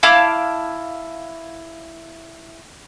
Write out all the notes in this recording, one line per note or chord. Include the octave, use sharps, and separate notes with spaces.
E4 F5 A5 D6